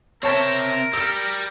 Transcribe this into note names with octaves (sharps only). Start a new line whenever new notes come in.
C4 A#4 C#5 E5 A5
G3 E6